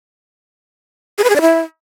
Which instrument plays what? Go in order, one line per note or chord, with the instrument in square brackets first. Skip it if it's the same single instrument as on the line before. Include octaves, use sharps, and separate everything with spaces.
[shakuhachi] G#4
B4
G#4
D5
E4